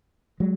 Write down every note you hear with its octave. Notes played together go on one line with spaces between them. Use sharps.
F#3 G#3